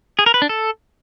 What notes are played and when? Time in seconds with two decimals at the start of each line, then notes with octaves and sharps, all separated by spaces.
0.19 G#4
0.26 A#4
0.34 B4
0.42 D4
0.49 A4